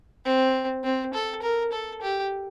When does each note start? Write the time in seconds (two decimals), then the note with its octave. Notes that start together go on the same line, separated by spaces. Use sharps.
0.25 C4
0.83 C4
1.13 A4
1.42 A#4
1.72 A4
2.01 G4